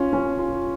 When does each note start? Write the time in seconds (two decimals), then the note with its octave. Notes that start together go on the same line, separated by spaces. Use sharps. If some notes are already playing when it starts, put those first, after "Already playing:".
Already playing: C#4 F4
0.13 C#4
0.39 F4